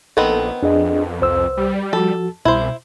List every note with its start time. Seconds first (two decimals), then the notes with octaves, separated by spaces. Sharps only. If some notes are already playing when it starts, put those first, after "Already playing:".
0.17 A#1 D#3 B3 C4 A4
0.63 F2 D4 G#4 D#5
1.21 C2 C5 E6
1.58 G3
1.93 F3 F#4 A4
2.45 C2 B2 E4 C5